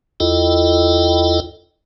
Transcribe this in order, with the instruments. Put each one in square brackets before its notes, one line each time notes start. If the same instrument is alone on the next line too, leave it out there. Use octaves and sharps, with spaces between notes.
[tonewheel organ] E2 E4 F4 A4 D#5 G5